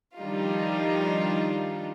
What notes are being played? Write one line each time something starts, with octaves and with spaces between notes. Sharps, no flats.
D#3 F3 G3 D4 D#4 F4